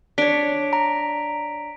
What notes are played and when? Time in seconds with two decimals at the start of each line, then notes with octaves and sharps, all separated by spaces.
0.18 D4 C#5 B6 D7
0.73 A#5